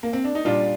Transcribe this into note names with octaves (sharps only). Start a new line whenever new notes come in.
A#3
C4
D4
D#4
A#2 G3 D4 F4